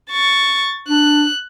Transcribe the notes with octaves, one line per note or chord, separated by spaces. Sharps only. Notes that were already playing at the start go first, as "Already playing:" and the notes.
C#6 A6
D4 F#6